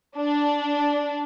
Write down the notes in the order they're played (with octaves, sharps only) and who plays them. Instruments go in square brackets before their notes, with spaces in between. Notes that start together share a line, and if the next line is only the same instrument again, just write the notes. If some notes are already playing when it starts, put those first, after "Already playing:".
[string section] D4